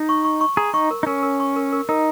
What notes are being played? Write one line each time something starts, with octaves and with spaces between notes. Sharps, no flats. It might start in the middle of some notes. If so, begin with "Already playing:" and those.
Already playing: D#4
C#6
C#6
C#6
G#4 A#5
D#4 C#6
A#4
D#4
C#4 A#4
A#4
C#6
A#4
A#4
D#4 A#4